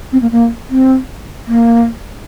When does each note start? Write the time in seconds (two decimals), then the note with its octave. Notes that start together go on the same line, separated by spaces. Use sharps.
0.12 C4
0.22 A#3
0.32 A#3
0.70 C4
1.47 A#3